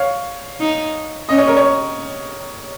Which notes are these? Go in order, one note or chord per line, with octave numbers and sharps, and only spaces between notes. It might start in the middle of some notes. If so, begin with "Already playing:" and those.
Already playing: C#5 F5
D#4
C#4 D#5
C#5
A#4
C#5